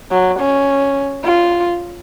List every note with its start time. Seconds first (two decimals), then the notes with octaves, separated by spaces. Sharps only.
0.11 F#3
0.40 C#4
1.24 F4